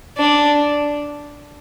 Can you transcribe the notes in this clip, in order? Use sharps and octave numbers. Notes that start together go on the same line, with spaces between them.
D4